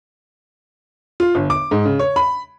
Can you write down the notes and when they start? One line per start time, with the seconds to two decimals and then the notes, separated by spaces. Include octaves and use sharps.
1.20 F4
1.35 G1
1.50 D6
1.71 G#2
1.85 C#3
1.99 C#5
2.16 B5